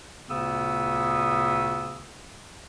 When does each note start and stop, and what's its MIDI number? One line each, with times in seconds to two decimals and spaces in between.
0.30 2.10 38
0.30 2.10 46
0.30 2.10 49
0.30 2.10 59
0.30 2.10 87
0.30 2.10 88